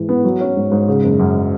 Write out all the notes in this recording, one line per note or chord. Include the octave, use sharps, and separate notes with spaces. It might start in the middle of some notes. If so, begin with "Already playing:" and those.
Already playing: G#2 E3 G#3
B3
F#3
C#4
G#2
G#2
C#3
F#1
F#2